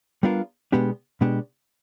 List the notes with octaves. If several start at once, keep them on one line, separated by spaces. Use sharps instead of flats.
G3 B3 D4 F4 A#4
B2 G#3 B3 D4 G4
B2 G#3 B3 D4 G4